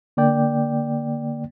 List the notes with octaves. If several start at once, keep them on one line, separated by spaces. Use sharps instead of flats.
D3 A#3 D5 G5